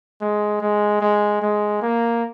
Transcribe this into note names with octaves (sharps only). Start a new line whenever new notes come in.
G#3
G#3
G#3
G#3
A#3